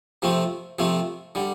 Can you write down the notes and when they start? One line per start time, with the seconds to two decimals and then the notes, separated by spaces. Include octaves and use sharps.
0.22 C3 F3 A3 C4
0.79 C3 F3 A3 C4
1.35 D3 G3